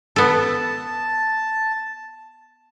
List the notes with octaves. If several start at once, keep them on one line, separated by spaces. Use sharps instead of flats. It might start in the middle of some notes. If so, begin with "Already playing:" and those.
B3 A4 A5